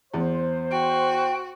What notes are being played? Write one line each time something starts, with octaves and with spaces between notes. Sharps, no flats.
E2 C5
F#4 G5